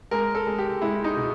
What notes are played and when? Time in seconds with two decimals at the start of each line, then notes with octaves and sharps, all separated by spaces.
0.11 G#3 A#4
0.35 A4
0.47 G#3
0.58 G4
0.81 G#3 E4
1.04 D#4
1.16 B2